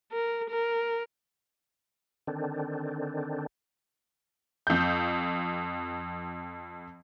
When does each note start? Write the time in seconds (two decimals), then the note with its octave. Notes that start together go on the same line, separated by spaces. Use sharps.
0.12 A#4
0.50 A#4
2.27 D3 D#3 C4 D4
4.67 F2 G6